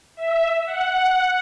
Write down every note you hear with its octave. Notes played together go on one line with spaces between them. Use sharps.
E5
F#5